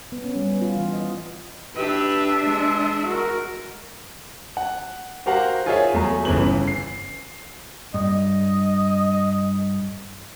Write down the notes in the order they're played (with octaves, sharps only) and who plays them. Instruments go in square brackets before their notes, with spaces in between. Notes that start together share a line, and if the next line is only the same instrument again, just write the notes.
[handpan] B3
C#4
G3
B3
F4
E3
D#5
[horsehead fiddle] D4 E5 [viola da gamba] G4 B4
[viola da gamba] G#3
[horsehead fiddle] F#4 A#4
[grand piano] F#5
F#4 G4 A#4 C5 F5 F#5
F4 G#4 A#4 C#5 D#5 E5
E2 F#3 A3 G#4 A#5
G1 E2 C#3 E3 B4 F#7
C7
[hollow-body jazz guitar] G2 [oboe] D#5